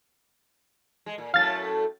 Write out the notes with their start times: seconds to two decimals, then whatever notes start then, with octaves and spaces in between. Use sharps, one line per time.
1.06 G#3
1.18 A#2
1.34 F#2 A2 A3 F5 A6